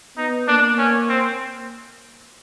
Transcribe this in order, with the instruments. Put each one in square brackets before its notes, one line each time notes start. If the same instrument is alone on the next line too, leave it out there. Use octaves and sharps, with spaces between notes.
[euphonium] B3 [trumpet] D#4
[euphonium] A#3 [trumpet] D4
[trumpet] C#4
C4